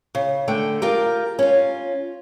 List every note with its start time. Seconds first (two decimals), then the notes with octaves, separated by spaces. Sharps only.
0.15 C#3
0.48 D3 A3 G5
0.82 F4 G4 A#4
1.39 C#4 F4